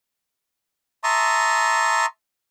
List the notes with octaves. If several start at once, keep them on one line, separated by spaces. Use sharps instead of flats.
E5 A5 A#5 C6 C#6 D#6